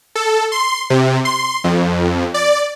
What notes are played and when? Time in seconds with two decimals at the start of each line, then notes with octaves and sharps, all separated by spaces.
0.15 A4
0.52 C6
0.90 C3
1.25 C6
1.64 F2
2.34 D5